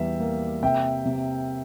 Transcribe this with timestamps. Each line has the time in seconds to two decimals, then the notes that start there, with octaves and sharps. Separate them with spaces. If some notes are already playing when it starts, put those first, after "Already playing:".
Already playing: E2 G3 E5
0.20 A#3
0.62 C3 E5 G5
1.05 C3